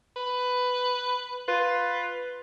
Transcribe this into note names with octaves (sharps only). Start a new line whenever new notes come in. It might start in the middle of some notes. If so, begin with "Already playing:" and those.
B4
F4 B4